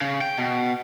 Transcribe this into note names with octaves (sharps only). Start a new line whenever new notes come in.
C#3
G5
B2